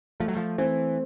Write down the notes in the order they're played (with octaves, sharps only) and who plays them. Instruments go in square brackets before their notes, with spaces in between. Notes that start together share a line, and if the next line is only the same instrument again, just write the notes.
[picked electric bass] F3 [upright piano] A3
[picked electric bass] F#3
F3
[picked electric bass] E3 [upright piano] C4